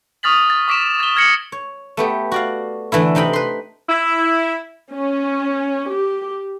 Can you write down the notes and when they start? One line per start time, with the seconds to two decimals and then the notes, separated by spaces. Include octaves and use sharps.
0.23 C#6 D#6 F6 A6 B6 F#7
0.50 A6
0.68 C#6 D6 B6 D7 E7
1.00 A6 G7
1.16 F6 G#6 A#6 C#7 F#7
1.52 C#5
1.97 A3 B3 G4
2.32 F#4 D5 F5
2.92 D3 E3 A3 E4
3.15 C3 D#4 G5 B5
3.33 B4 C6
3.89 E4
4.91 C#4
5.90 G4